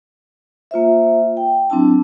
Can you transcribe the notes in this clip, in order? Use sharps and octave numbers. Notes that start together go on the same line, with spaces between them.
A#3 F4 C5 E5
G5
F#3 C4 D4 E4 A5